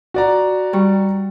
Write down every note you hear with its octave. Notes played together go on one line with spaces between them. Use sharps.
F#4 D5 A#5
G3 C#6